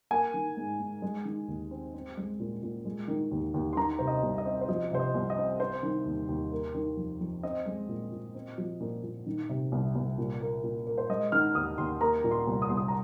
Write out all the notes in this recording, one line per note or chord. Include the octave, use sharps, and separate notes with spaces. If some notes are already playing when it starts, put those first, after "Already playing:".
A#3 G#5
D#3
G#2
G#2
G#3
D#3
D#2
C4
C4
G#3
A#2
A#2
G#3
D#3
D#2
D#2
C6
D#3 A#5
C3 C5
D#5
C2
D#5
C4
C5
F3 D#5
C3 C5
D#5
C2
D#5
C4
C4 C5
D#3
D#2
D#2
A#3
D#3
F2
F2
C4 D#5
G#3
A#2
A#2
C4
F3
A#2
A#2
D#3
C3
C2
C2
A#2
A#3
A#2
A#3
C5
G#3 D#5
D#3 F6
D#2 D#6
D#2 C6
A#3 A#5
A#2
C6
C2
D#6
C2 C6
D#6
A#5